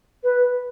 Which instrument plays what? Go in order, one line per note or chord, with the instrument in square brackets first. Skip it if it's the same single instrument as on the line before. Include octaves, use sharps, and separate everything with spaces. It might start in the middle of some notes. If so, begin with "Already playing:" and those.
[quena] B4